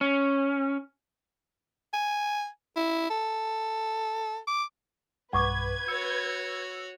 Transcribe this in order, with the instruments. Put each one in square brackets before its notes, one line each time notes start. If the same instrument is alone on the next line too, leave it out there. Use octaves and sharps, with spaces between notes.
[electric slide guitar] C#4
[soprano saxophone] G#5
E4
A4
D6
[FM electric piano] B1 G2 [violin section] B4 G#6 [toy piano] F#5 C#6 D6
[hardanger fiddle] F#4 C#5 [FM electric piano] E6 C#7